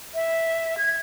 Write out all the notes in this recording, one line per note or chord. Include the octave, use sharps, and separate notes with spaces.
E5
G#6